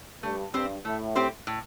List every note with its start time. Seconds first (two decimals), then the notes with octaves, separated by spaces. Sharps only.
0.23 G2 A3
0.54 G2 C4 G4 C5
0.84 A2 A3
1.15 C4 G4 C5
1.47 A2